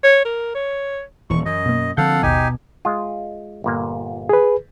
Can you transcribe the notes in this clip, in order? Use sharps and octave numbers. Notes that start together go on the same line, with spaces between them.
C#5
A#4
C#5
D#1 E3 C#6
F#2 D#5
B2 A#3
D3 F3 C4 A4 F5 F#5 G6
A1 D#2 B2 D#4 G4 G#5
G#3 F4
G1 A#2 A#3
G#4 B4